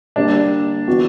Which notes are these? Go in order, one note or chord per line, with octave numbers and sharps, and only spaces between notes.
D3 G3 A#3 D4
E3 B3 F#4